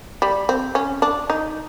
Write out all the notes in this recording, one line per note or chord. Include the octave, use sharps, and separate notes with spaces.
G3
C4
C#4
D4
D#4